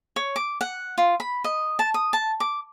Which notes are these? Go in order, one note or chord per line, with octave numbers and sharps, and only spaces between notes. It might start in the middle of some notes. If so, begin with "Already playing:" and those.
C#5
D6
F#5
F4
B5
D#5
A5
D#6
A5
D6